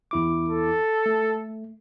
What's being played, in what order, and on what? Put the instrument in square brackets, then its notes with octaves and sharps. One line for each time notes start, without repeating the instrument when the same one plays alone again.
[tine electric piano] E2 E4 D6
[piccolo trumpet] A4
[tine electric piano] A3